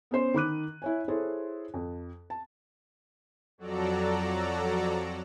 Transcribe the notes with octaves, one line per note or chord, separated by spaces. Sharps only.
B3 C#4 C5
D#3 B5 D6 F#6 D#7
E4 C#5 G#5
E4 G#4 A4 C5 C#5
F2
A5
F2 F#3 F#4 A4 D5 A#5